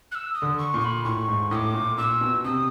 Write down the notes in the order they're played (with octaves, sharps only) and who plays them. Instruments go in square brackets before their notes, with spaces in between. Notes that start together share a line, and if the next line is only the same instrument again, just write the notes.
[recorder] F#6
E6
D#6
[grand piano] D3
[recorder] C#6
[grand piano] A#2
[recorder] C#6
B5
[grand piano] A2 [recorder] C#6
[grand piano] G#2
[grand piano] A2 [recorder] D6 D#6
[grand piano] A#2
[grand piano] A#2 [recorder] E6
[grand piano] B2
[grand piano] C3 [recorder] D#6